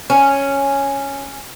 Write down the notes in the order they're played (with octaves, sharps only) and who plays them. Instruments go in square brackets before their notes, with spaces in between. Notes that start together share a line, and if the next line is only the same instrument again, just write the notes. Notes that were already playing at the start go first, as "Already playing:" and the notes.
[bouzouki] C#4